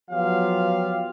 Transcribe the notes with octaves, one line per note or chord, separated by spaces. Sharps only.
F3 F#3 B3 F4 G4 F5